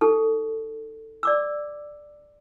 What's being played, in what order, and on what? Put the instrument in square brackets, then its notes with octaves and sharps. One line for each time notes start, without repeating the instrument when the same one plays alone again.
[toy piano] D#4 G4 A4
D5 D6 E6